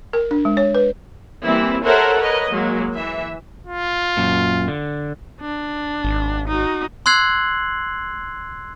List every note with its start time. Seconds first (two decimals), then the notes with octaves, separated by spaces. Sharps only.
0.13 A#4
0.31 D4
0.45 G#3
0.57 C#5
0.75 B4
1.43 E3 G3 A#3 C4 E4
1.84 A4 A#4 C5 C#5 E5 F#5
2.17 A#4 B4 C#5 D#5
2.51 F#3 G#3 A#3
2.95 E3 E5
3.67 F4
4.17 F#2 A#2
4.68 D3
5.41 D4
6.04 G#1
6.48 D#4 F#4
7.06 C6 E6 F#6 G#6 C7 F#7